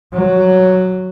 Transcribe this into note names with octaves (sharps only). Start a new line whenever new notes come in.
F#3